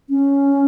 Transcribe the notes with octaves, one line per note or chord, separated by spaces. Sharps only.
C#4